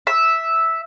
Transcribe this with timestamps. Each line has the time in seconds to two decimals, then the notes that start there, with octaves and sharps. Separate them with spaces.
0.07 E5